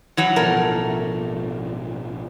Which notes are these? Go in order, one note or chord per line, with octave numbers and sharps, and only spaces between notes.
E3 F#3 F#4
A1 B2 F3 A3 A#4